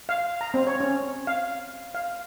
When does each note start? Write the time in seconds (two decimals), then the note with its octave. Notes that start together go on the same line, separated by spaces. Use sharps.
0.09 F5
0.41 A#5
0.54 C4
0.67 C#5
0.80 C#4
1.27 F5
1.95 F5